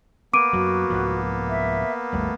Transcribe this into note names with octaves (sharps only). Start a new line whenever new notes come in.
A#3 B3 D6 D7 D#7
F#2 F#3 F#4
C2 G#2 F3
E5
G#1 D#2 G3 A3